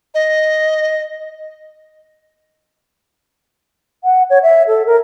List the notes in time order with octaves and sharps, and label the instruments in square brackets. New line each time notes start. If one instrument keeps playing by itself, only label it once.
[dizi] D#5
[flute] F#5
C#5
E5
A4
A#4